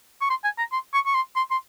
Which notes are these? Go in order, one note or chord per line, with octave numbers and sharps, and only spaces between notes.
C#6
C6
G#5
A#5
C6
C#6
C#6
C6
C6
C6